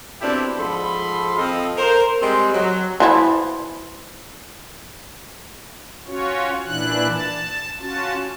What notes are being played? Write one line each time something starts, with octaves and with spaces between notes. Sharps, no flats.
B2 C4 D4 E4 G4 A4
G#2 F3 A4 B5 C6
F3 C4 A4 D#5 F5
A#4 C5
G3 G#3 C4 C6
F#3
E3 F3 E4
C#4 F4 F#4 C#5
A#2 E3 D4 E4 F#6
A5
C#4 F4 F#4 A5